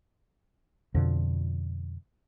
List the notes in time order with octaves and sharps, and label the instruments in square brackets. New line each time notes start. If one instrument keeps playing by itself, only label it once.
[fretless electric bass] F2 B2 D3 F3